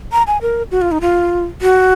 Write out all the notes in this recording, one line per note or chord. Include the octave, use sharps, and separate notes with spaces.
A#5
G#5
A#4
F#4
F4
D#4
F4
F#4